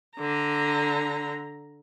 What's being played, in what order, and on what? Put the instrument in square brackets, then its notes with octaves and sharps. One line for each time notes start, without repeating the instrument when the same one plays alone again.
[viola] D3 A#5